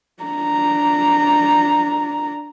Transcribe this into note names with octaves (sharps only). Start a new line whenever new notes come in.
D4 A#5